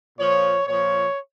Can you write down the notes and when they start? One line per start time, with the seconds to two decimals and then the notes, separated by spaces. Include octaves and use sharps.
0.18 A#2 F3 C#5
0.66 A#2 F3 C#5